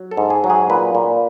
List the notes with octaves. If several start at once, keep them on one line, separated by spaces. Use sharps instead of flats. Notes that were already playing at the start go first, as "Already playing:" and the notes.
Already playing: F#3
A4
G#2
G#4
F#3
G#4
A#2 B4
A#2